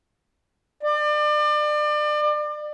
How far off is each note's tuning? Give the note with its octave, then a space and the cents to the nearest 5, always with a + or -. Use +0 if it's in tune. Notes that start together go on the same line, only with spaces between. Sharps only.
D5 +35